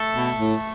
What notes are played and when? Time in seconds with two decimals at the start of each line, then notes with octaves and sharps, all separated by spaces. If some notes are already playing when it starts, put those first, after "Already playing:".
Already playing: A3 A4
0.14 B2
0.38 A2